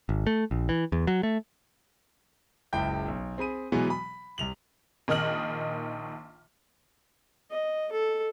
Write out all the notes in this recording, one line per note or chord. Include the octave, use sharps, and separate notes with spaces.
G#1
A3
A#1
E3
E2
F#3
A3
F#1 C#2 E4 G5 G6
B1
C4 G#4 B5 D#7
B2 E3 F#3 G#3 B3
B5
C2 F7 F#7
A#1 D#3 D#4 D#5 F6 F#7
D#5
A4